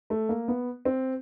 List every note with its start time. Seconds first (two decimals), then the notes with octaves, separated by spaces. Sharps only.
0.10 A3
0.29 A#3
0.48 B3
0.85 C4